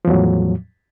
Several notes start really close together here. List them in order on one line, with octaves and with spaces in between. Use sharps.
F3 E2 F#3 A2